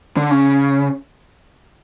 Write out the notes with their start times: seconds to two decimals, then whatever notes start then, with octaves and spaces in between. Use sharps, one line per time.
0.17 D3
0.31 C#3